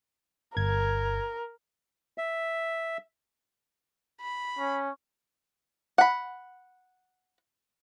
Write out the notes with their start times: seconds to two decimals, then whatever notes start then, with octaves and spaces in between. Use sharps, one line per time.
0.57 G1 A#4 G#6
2.18 E5
4.21 B5
4.59 C#4
5.98 F#5 B5